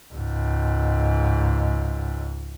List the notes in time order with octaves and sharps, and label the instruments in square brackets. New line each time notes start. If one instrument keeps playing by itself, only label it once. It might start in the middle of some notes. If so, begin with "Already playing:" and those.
[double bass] C#2 G#2